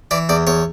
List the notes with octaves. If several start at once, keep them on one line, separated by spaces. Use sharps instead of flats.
E3 D5
E2 D5
E2 C#5